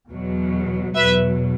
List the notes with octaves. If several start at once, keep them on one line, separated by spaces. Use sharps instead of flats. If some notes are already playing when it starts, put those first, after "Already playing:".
E2 B2 F#3
E2 B2 F#3 B4 E5